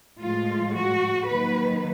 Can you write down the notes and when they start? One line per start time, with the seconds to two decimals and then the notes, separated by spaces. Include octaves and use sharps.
0.21 A2 F3 G#3 F4
0.74 F#4
1.28 D#3 F#3 A#3 B4